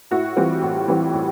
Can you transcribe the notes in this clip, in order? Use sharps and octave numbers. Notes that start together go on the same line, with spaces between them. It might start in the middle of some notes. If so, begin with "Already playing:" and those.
A2 E4 F#4
E3 G3 C4 F4
A2
E3 G3 C4
A2